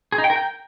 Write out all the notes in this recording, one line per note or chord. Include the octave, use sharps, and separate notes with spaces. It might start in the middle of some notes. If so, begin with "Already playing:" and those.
G#4
D#4
G5
A#4
G5